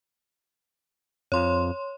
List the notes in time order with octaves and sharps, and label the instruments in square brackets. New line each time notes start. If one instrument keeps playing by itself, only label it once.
[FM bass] F2 [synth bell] C#5 C6